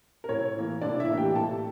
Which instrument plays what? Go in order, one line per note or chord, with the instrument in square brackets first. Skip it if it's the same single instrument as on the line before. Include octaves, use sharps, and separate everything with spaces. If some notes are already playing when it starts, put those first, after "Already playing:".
[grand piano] A#4
A2 C#5
E3 A#3
A2 D4 D5
E4 E5
E3 A#3
G4 G5
A2 A4 A5